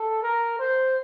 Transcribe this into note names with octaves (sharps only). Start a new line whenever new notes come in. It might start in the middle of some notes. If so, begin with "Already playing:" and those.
Already playing: A4
A#4
C5